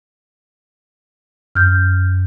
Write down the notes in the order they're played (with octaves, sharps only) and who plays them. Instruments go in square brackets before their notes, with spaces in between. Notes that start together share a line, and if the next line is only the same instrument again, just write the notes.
[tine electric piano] F#2 [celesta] F6 G6